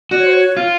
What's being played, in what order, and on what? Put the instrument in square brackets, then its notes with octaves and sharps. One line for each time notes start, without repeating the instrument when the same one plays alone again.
[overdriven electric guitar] F#4 [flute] D5
[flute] C#5
C5
C#5
[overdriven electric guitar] F4